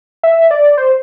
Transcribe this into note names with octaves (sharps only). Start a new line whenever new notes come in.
E5
D5
C5